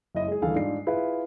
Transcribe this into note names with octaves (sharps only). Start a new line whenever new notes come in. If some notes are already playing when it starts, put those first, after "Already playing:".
F#1 E4 D#5
G#3 G#4
D#1 D3 E3 G#4 A4 F5
G#2 D4 F4 C7
E4 F4 G#4 B4